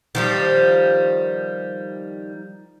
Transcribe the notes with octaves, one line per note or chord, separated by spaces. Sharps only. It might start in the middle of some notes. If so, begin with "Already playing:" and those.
D#3 F3 G3